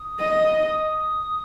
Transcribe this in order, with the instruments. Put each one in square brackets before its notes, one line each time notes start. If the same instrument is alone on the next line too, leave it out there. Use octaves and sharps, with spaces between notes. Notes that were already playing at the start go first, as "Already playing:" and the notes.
Already playing: [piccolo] D#6
[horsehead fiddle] D#5
[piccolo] D#6